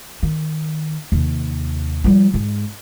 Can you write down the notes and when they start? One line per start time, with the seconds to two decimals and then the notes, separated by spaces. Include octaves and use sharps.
0.23 D#3
1.12 D#2 C3
2.04 F3 G3
2.34 G#2 G#3